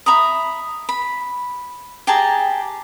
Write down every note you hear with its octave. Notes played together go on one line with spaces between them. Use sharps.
E5 A#5 B5 D#6
B5
G4 G#4 A5 A#5